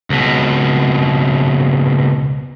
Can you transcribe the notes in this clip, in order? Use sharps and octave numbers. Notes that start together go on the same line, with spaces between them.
C#2 B2